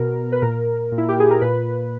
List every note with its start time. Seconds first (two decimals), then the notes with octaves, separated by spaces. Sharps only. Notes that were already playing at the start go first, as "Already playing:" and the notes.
Already playing: B2 A#4
0.32 B4
0.42 A#2 A#4
0.92 A#2
0.98 E4
1.09 G4
1.20 G#4
1.31 A#4
1.41 A#2 B4